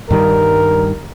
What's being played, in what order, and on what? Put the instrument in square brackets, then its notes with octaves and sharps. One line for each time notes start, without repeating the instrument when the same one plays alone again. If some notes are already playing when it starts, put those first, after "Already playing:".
[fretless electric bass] G2 D#3 G3 [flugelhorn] A#4